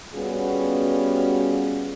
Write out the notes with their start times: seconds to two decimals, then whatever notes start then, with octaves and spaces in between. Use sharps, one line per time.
0.14 G3 B3 C#4 F4 F#4 G#4